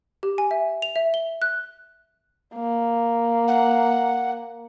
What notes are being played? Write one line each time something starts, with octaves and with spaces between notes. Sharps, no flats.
G4
G#5
E5
F7
E5
G7
F#6
A#3
F#5